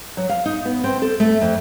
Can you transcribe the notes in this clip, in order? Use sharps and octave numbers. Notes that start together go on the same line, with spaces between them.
F#3
F5
D#4
B3
C4
A4
A3
F2